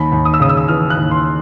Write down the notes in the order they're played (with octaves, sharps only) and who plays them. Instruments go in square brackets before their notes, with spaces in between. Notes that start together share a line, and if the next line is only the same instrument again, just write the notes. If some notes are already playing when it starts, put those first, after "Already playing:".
Already playing: [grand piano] D#2 B5
D#2
D#6
E6
C#3 D#6
E6
D#6
E3 F6
F#6
D#2
C6